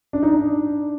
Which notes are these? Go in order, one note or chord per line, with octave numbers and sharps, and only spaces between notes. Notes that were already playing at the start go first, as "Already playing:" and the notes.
D4
D#4
D4